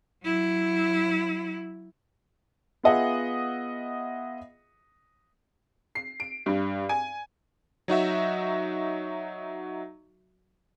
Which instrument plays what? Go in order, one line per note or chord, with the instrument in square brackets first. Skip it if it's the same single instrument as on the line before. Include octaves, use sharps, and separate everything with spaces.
[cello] F#3 E4
[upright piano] B3 F4 G#4 D#5 E5 F#5
C7
D7
G2
G#5
[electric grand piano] F#3 D#4 F#4 E5